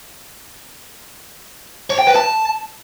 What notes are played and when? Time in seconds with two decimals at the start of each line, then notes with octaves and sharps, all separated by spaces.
1.90 C#5
1.99 G5
2.07 B4
2.16 A5